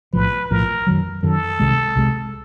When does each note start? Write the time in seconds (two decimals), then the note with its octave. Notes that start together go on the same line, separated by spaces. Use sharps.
0.13 B1 A2 F3 B4
0.50 B1 A2 F3 A#4
0.87 F#2 D#3 F#3
1.23 F#2 D#3 F#3 A4
1.60 C2 C3 D#3 G#3
1.96 C2 C3 D#3 G#3